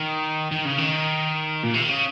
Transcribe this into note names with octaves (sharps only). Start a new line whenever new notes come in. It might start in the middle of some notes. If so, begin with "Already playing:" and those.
Already playing: D#3
D#3
C#3
D#3
A#2
C3
D#3
C#3